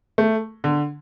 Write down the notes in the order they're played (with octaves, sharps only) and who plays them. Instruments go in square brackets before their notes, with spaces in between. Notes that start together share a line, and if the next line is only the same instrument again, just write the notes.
[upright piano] A3
D3